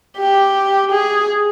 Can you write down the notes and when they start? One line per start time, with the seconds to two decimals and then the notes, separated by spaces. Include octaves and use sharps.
0.17 G4
0.91 G#4